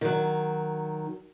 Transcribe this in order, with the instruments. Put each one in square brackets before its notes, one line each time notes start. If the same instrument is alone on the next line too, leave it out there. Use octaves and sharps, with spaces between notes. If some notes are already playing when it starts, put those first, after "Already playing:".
[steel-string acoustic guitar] D#3 F#3